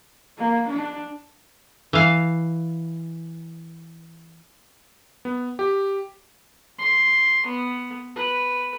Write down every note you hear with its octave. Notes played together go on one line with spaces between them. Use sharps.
A#3
D4
E3 F5
B3
G4
C6
B3
B4